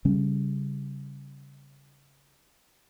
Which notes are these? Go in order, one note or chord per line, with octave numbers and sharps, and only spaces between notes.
C#3 G3 C#4